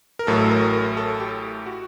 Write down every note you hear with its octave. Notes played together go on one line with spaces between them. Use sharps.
A#4
A1 A2 F#3 A4
A#4
A#4
A4
G4
F#4